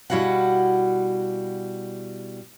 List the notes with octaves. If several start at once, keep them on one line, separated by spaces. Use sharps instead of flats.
B2 G3 E4 F#4 F5 F#5